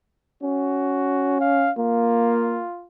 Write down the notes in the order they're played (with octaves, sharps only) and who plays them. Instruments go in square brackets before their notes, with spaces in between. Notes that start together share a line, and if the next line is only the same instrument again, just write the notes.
[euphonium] C#4 [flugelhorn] F#4
[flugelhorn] F5
[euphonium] A#3 [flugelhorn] F4